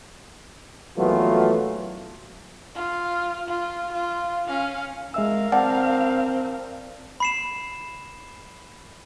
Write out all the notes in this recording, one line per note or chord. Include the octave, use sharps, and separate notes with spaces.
A#1 E3 F#3 A3 B3 F4
F4 F5
F4
F4
C#4 F5
G#3 A#4 E5 F5 E6
C4 D5 F#5 A5
B5 C7 E7